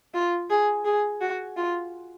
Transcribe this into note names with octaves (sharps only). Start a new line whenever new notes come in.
F4
G#4
G#4
F#4
F4